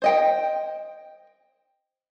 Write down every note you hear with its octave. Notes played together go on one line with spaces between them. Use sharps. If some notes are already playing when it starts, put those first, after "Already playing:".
C5 D#5 G5